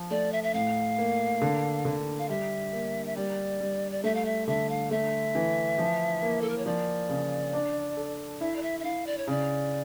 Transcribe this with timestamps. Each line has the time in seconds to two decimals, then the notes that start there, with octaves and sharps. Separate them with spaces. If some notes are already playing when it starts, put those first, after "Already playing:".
Already playing: F3
0.11 A3 D5
0.33 E5
0.44 E5
0.54 A2 F5
0.98 A#3
1.42 D3
1.85 D3
2.19 F5
2.29 G3 E5
2.73 A#3
3.06 E5
3.16 G3 D5
3.60 G3
3.92 D5
4.04 A3 E5
4.15 F5
4.25 E5
4.48 D3 E5
4.70 F5
4.91 A3 E5
5.35 E3
5.78 F3
6.22 A#3
6.41 A4
6.50 A#4
6.58 C#5
6.66 F3 D5
7.09 C#3
7.53 D4
7.97 A4
8.41 E4 E5
8.56 D5
8.63 E5
8.80 E5
8.84 E4 F5
9.07 D5
9.18 C#5
9.27 C#3 D5